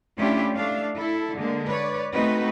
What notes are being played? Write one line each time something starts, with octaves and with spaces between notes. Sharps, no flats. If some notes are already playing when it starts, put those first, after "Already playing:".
A3 C#4 D4 E4 F4 G4
A3 D4 F5
E4 A4
D3 G#3 A#3
B4 C#5 D5
A3 B3 C4 D#4 F#4 B4